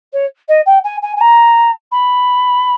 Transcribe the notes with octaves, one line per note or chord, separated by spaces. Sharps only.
C#5
D#5
G5
G#5
G#5
G#5
A#5
B5